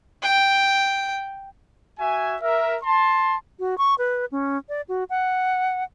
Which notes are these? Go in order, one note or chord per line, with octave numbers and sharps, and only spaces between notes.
G5
F#4 E5 G#5
A#4 E5
A5 C6
F#4
C#6
B4
C#4
D5
F#4
F#5